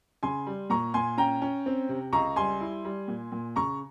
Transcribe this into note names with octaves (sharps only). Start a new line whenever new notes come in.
C#3 G#5 C6
G3
A#2 A#5 C#6
A#2 G#5 C6
C#4 G5 A#5
C#4
C4
C3
C#2 A#5 C#6
G3 G#5 C6
E4
G3
A#2
A#2
C#3 A#5 C#6